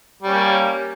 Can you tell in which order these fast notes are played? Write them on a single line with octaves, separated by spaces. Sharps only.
G3 C#4 A#3